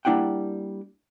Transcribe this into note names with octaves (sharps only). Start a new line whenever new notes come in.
G3 A#3 D4 E4 F#5 G5